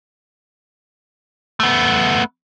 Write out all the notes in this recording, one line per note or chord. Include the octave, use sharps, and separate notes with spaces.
A3 B3